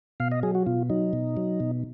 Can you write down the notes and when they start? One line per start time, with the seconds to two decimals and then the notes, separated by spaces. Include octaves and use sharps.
0.20 B2 F5
0.32 D#5
0.43 F#3 G#4
0.55 F#4
0.66 B2 F4
0.90 F#3 D#4
1.13 B2
1.37 F#3
1.60 B2